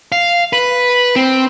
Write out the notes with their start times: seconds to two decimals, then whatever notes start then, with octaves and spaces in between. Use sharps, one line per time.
0.12 F5
0.53 B4
1.16 C4